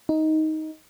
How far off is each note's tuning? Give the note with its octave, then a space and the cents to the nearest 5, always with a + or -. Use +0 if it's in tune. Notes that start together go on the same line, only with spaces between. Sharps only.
D#4 +10